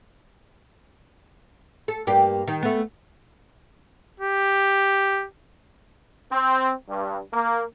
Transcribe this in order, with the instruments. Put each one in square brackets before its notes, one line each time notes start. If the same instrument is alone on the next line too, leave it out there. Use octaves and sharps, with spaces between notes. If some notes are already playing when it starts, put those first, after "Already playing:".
[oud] A4
G2 A#3 G4
D#3
A3 B3
[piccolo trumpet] G4
[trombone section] C4
G2
A#3